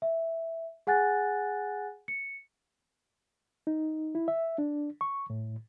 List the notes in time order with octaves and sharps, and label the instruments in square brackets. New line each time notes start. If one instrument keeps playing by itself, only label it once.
[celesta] E5
G#4 F#5 G#5 F#6 A6
C#7
[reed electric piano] D#4
E4
E5
D4
C#6
A2